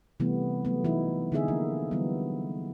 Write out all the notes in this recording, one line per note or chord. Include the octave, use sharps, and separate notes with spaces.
C3 E3 G3 A3 B3
F#3 A3 B3
E3 D#4 E4
D3 B3 D#4 G#4 E5
F3 A#3
D3 E3 F#3 G3 B3